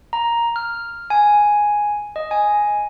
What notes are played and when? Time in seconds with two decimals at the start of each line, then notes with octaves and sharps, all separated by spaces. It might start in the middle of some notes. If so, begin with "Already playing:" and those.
0.13 A#5
0.56 F6
1.10 G#5
2.16 D#5
2.31 G#5